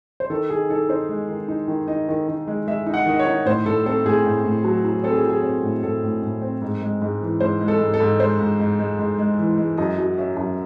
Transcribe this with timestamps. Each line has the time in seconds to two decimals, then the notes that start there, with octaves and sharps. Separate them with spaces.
0.20 C5
0.30 D#3 A4
0.50 D#3 G#4
0.69 D#4 A4
0.89 D#4 C5
1.09 G#3
1.29 D#3
1.48 D#4
1.68 D#3
1.88 D#4 D#5
2.09 D#3
2.28 D#3
2.47 G#3
2.68 G#3 E5
2.86 D#4
2.94 F#5
3.06 D#3 D#5
3.19 C#5
3.27 D#4
3.46 A2 C5
3.65 A2 A4
3.86 C4 A4
4.05 A2 G#4
4.25 A2
4.44 A2
4.64 F#3
4.85 F#3
5.04 C4 A4
5.12 G#4
5.24 F#3
5.29 G#4
5.44 C4
5.64 A2
5.83 A2 A4
6.03 A2
6.22 A2
6.42 C4
6.62 G#2
6.82 G#3
7.02 G#2
7.22 E3
7.41 G#2 C5
7.61 G#3
7.68 A4
7.80 G#2
7.94 A4
8.00 G#2
8.20 G#3 C5
8.39 G#2
8.60 G#2
8.79 G#3
8.99 G#2
9.18 G#3
9.39 E3
9.58 G#3
9.78 F#2 D#5
9.98 F#3
10.18 C#4 E5
10.37 F#2